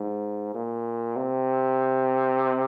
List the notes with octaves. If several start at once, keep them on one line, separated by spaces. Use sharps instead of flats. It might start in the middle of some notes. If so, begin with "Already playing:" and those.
Already playing: G#2
A#2
C3